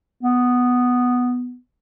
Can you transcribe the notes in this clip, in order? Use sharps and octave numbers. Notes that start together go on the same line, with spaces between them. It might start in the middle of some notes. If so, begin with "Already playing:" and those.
B3